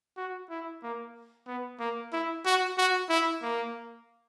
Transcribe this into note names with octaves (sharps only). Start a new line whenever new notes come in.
F#4
E4
A#3
B3
A#3
E4
F#4
F#4
E4
A#3